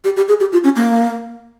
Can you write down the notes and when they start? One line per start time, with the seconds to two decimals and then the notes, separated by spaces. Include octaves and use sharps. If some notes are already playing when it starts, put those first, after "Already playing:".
0.05 G4
0.17 G4
0.28 G#4
0.40 G4
0.52 F4
0.64 C#4
0.76 A#3